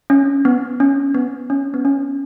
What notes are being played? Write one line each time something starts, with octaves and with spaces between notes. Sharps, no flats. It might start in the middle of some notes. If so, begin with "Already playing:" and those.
C#4
B3
C#4
B3
C#4
B3
C#4